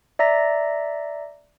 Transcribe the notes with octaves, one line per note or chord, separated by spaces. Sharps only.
D5 E5 A#5 A#6